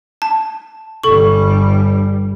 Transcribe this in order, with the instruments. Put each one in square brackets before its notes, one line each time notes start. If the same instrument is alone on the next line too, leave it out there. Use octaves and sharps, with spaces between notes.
[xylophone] A5
[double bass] G1 G3 [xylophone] A4 C#6